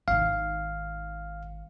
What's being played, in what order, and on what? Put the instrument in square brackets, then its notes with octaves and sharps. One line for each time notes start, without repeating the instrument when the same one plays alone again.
[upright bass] G#1 D#3 [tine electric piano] F5